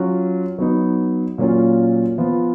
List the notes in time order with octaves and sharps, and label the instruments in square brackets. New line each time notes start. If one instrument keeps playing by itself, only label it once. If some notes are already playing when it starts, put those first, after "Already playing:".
Already playing: [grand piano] F#3 C#4 F4
F#3 B3 D#4
A#2 F#3 A#3 C#4 F4
F3 B3 F4